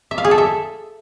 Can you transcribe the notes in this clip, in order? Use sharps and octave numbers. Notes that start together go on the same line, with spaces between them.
E5
F5
G#4
A4
E5